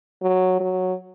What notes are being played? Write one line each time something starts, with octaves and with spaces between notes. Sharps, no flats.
F#3
F#3